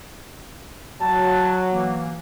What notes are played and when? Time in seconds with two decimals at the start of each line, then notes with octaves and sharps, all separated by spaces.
1.01 F#3 A5
1.72 E3 A#3